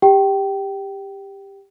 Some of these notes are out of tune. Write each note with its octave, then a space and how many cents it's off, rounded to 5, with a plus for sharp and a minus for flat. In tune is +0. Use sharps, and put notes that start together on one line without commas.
G4 +15 G5 -20